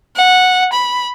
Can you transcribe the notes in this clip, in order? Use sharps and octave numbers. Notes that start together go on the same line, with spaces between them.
F#5
B5